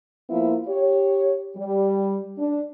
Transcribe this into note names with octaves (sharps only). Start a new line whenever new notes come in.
F3 A#3 B3 E4 F4
G4 C#5
G3
D4